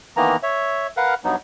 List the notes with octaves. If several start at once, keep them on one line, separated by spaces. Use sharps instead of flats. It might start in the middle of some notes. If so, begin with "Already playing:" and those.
D#3 E3 A#3 B3 A#5
C#5 E5
A#4 B4 F5 F#5
G2 F#3 B3 D#4